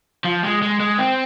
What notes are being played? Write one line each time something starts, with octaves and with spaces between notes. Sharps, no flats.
F3
G#3
G#3
G#3
C4